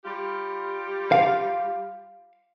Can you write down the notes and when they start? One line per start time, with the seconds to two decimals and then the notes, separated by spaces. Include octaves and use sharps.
0.03 G3 F4 G4
1.12 F5